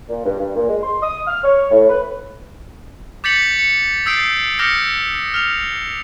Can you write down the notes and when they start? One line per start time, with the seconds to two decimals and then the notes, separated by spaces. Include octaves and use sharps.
0.09 A#2
0.26 G2
0.39 G2
0.56 A#2
0.69 G#3
0.83 C6
1.02 D#6
1.27 F6
1.44 C#5
1.70 A2
1.90 B4
3.24 D6 G6 A6 B6 C#7 F#7
3.59 C#7
4.06 D#6 E6 G6 A6 C7 D7
4.59 D6 D#6 F6 G6 A#6 C#7
5.34 F6 F7